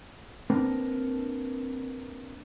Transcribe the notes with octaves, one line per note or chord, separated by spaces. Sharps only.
A#3 C4 D4 A#4 B4